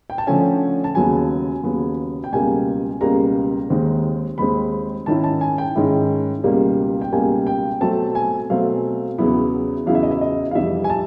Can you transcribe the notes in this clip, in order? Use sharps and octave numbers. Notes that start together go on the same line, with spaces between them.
G5
A5
D3 F3 A3 C#4 G#5
A5
D#2 C#3 F#3 B3 G#5
D#2 C#3 F#3 B3
G5
C#2 B2 G3 A#3 G#5
C#2 B2 G3 A#3 A#5
D#2 D#3 G#3 C4
D#2 D#3 G#3 C4 B5
G#2 D#3 G#3 C#4 E4 A5
A5
G#5
G5
G#2 D#3 G#3 C#4 E4
C#2 B2 G3 A#3
G5
C#2 B2 G3 A#3 G#5
G5
B2 F#3 A3 C4 A5
G#5
B2 F#3 A3 C4 F5
E2 C#3 F#3 B3 E4
E2 C#3 F#3 B3 E4 F5
E5
D#5
E5
D#5
F5
F2 C3 E3 G3 E5
G#5
A5